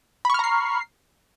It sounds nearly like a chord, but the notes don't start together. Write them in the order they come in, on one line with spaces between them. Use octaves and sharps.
B5 C#6 F6 A#5 C7